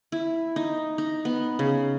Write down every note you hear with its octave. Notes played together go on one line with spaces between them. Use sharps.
E4
D#4
D#4
B3
C#3